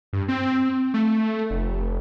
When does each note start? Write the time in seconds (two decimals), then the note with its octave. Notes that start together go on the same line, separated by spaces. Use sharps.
0.13 G2
0.28 C4
0.94 A3
1.50 F1